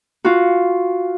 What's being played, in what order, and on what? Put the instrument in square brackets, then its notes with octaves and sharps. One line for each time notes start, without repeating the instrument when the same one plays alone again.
[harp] F4 F#4